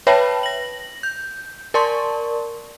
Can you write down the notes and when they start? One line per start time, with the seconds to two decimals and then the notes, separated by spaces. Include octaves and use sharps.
0.07 B4 C#5 E5 G5 A5 B5
0.43 A#6 F#7
1.03 G6
1.74 A#4 D5 A5 C6 C#6